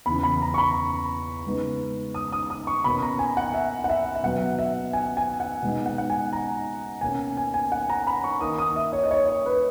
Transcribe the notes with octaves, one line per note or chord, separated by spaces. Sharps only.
E2 C#3 E3 B5
B5
A#5
C#6
B5
C#3 G#3 B3 D#4
D#6
D#6
D#6
C#6
B2 A#3 C#4 B5
A#5
G#5
F#5
E5
F#5
E5
E5
B2 F#3 B3 F#5
E5
G#5
G#5
F#5
B2 G#3 D#4
F#5
F#5
G#5
A#5
B2 A#3 C#4 G#5
G#5
G#5
F#5
A#5
B5
C#6
D#3 A#3 D#4 D#6
D#6
E5
C#5
D#5
C#5
C#5
B4